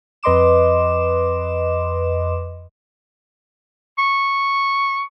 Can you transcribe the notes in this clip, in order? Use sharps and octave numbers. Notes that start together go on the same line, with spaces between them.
F2 B4 D#5 C6 D6 E7
C#6